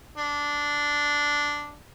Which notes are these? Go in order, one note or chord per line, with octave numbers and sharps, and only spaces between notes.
D4